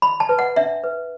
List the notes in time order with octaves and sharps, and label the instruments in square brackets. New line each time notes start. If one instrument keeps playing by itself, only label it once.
[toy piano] E4 B5
A5
B4
F#5
D4 E5
B4